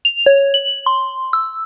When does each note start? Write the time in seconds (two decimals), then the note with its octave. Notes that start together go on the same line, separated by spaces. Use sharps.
0.05 F7
0.26 C#5
0.54 F#7
0.86 C6
1.33 E6